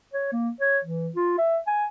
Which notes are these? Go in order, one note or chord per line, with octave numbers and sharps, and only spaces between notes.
C#5
A#3
C#5
E3
F4
E5
G#5